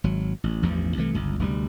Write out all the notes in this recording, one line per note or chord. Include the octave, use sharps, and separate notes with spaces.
G#1 F#3
A1
A1 E2 G2 F3
C2 E3 A3
G1 C#2
F1 D2 A#2 G3